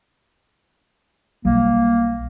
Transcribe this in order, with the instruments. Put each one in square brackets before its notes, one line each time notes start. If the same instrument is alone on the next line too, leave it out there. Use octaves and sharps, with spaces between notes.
[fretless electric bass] B1 G3 [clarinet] A#3